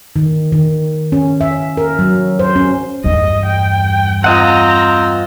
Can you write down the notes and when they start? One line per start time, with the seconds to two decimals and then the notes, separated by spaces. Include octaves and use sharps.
0.16 D#3
0.52 D#3
1.12 C#4
1.41 E5
1.77 A#4
1.99 F#3
2.39 C5
2.56 C#4
3.04 E2 G2 D#5
3.46 G5
4.24 C4 F4 D#5 F#5 A#5